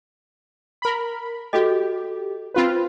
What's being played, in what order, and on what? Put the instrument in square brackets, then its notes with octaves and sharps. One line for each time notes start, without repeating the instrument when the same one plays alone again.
[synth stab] A#4 B5
[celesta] F#4 A4 D#5 [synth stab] G4
[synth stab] C4 F4 B4